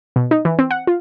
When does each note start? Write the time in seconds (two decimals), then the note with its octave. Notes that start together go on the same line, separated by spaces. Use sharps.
0.16 B2
0.31 D#4
0.45 E3
0.59 C4
0.71 F#5
0.87 F4